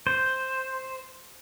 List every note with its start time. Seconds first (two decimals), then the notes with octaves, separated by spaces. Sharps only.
0.07 C5